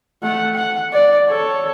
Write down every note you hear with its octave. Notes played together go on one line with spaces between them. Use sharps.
A3 F#5
F#5
D5
A4 C#5